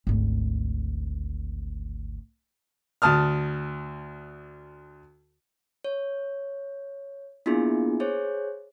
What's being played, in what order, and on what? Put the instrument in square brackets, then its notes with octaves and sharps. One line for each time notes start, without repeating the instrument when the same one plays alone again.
[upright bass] G#1 D2
[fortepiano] D2 A5 D#6 F6
[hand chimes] C#5
A#3 B3 D4 E4 F4 G#4
G#4 C5 C#5